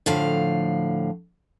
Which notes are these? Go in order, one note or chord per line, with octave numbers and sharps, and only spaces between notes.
A2 D3 F3 F5